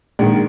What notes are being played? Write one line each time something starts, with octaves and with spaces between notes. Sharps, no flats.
A#1 G#2 D#3